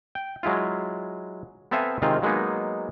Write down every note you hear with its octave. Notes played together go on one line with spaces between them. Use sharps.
G5
F#3 G#3 E4 F4
B3 C4 A4 E5 F5 G#5
C3 D#3 G#3 C4 F4
F#3 G#3 A#3 B3 D#4